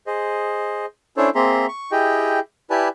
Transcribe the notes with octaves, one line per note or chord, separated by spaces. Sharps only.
G#4 C5 D#5
C#4 D4 E4 A4 C5 C#5
A#3 C4 G#4 E5 A#5 C6
C#6
E4 G4 G#4 D#5 G5
E4 G4 B4 D5 G#5 A5